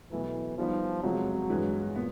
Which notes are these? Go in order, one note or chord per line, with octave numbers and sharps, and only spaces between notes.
B2 E3 F#3 A3
D#3 F3 G3 B3 D#4
E2 C3 F3 F#3 G#3
G2 E3 G#3
A#2 B3